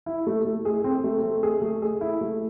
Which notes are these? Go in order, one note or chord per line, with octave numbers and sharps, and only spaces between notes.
E4
A3
A3
G#4
C4
A3
A3
G#4
A3
G#4
E4
A3